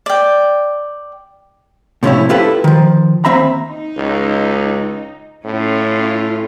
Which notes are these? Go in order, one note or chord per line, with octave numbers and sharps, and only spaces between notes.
D5 G5
A2 C3 F3 C#4 E4 C#5
E4 F4 G4 A4 B4 C5
D#3 F3
D#2 C4 E5 A#5 B5
D#4
C#2
A2 C#4 F4